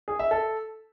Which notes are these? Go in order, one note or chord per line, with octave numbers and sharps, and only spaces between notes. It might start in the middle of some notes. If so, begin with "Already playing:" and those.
G#4
E5
A4